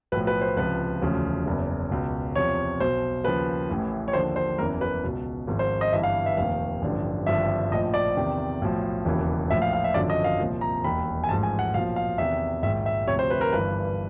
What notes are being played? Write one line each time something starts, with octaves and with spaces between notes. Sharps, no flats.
B1 A2 F3 B4
B4
C5
C#2 C3 F3 B4
E1 D2 C#3 F3
F#1 E2 C#3
C#2 B2
E2 C3 F3 C#5
B1 B2 C5
D#2 C#3 F3 B4
A1 A2 E3
C#5
D#2 D3 F3 C5
C5
F#1 E2 C#3 E3 A#4
B4
C#2 B2
G#1 G#2 F3
C5
D#5
G1 G2 E3 E5
F5
E5
F1 D#2 D#3 F5
A1 G2 D3 F3
G#1 G2 D3 F3 E5
A#1 A2 F3 D#5
D5
E2 C3 D#3
B1 A2 F3
E1 D#2 C#3 E3
A#1 A2 F3 E5
F5
F5
E5
G#1 F#2 D3 F3 D5
D#5
F5
C2 A#2 F3
A#5
E1 D#2 D#3 B5
G#5
A1 G#2 F3 A5
G#5
F#5
B1 A#2 F3 F5
F5
E2 C3 D#3 E5
A#1 G#2 D#3 E5
E5
D2 C3 F3 C#5
C5
B4
A#4
G1 G2 E3 B4